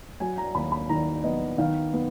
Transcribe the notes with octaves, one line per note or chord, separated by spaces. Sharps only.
F#3 G#5
A#5
D#2 B5
B5
D#3 A#5
B3 D#5
D#3 F5
B3